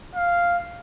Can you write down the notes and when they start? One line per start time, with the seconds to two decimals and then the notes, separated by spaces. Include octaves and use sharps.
0.15 F5